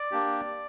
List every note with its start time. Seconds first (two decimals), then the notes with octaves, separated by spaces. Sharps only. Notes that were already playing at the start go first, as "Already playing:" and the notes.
Already playing: D5
0.11 A#3 D4 G4